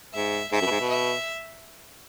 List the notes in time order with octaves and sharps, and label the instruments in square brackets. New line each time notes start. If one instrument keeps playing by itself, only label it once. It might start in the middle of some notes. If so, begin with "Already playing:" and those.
[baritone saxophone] G#2 [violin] E5
[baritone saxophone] G#2 [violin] E5
[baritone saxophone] F#2
B2
G#2
B2
[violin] E5